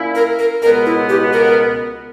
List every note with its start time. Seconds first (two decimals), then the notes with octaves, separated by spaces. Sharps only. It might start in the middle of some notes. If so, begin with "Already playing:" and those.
Already playing: A#2 A#3 C#4 E4
0.15 A#4
0.39 A#4
0.62 C#2 B2 G#3 B3 A#4
0.86 E4
1.09 G4
1.33 A#4